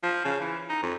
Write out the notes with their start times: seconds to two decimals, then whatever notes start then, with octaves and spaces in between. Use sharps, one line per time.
0.03 F3
0.25 C#3
0.41 E3
0.69 D#4
0.82 F2